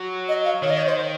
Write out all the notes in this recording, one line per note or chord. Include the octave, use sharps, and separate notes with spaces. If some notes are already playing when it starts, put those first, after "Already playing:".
Already playing: F#3
D#5
F5
D#3 C#5
D#5
C#5
C5